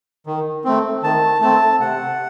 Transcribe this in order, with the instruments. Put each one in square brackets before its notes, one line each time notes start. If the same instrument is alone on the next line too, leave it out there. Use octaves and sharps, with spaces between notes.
[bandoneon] D#3
A3 C4
D#3 A5
A3 C4 A5
C3 F#5